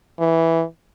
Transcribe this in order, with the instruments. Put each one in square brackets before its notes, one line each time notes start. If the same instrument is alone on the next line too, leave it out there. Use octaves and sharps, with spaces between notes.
[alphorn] E3